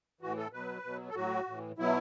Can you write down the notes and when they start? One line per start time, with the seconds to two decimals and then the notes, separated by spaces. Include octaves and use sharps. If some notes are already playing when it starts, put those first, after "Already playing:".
0.21 A2 E3 F#4
0.37 A4
0.52 B2 F#3 B4
0.84 B2 F#3
1.09 A4
1.15 A2 F#3 F#4
1.47 A2 E3
1.78 B2 F#3 E4